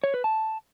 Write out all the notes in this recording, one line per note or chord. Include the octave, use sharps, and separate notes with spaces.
C#5
B4
A5